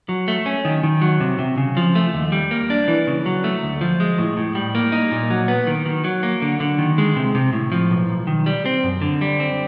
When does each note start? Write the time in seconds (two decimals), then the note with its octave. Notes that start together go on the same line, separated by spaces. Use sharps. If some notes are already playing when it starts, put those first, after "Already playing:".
0.09 F#3
0.28 A3
0.46 C#4
0.65 D#3
0.83 D#3
1.01 F#3
1.20 C3
1.39 C3
1.58 C#3
1.77 F3
1.95 A3
2.14 D#2
2.32 G3
2.51 A#3
2.70 D4
2.88 E3
3.07 C#3
3.26 F#3
3.44 A3
3.63 D2
3.81 F3
4.00 G#3
4.18 A2
4.37 A2
4.55 G3
4.75 A#3
4.92 D#4
5.12 A#2
5.30 F#3
5.48 B3
5.67 D#3
5.86 D#3
6.04 F#3
6.23 A#3
6.42 D3
6.60 D3
6.79 D#3
6.98 G#3
7.16 C3
7.35 C3
7.53 A2
7.72 F3
7.90 B1
8.09 B1
8.27 D#3
8.46 G3
8.66 C4
8.84 F#2
9.02 D3
9.21 G3
9.40 C4